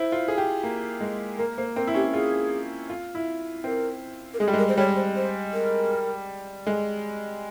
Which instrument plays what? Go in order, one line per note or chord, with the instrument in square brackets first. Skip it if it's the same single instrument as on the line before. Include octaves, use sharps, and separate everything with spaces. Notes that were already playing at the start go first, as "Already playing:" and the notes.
Already playing: [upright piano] E4 [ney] C5
[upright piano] F4
G#4
G4
A#3
G#3
[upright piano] A#3 [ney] A#4
[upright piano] A#3 [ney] C5
[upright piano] C4 [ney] A#4
[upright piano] E4
[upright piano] C#4 [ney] G4
[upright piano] F4 [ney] G#4
[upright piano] F4
E4
[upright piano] C4 [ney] A#4
[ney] A#4
[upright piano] G#3 [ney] G#4
[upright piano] G3
[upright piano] G#3 [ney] A#4
[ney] C5
[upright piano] G3 [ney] C#5
[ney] C5
C5
A#4
[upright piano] G#3